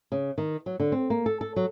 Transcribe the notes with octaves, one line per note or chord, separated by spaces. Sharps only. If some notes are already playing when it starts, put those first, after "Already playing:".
C#3
D#3
F#3
D3
C4
A#3
A4
A4
F#3